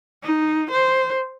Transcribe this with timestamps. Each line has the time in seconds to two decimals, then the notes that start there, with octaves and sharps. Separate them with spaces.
0.23 D#4
0.71 C5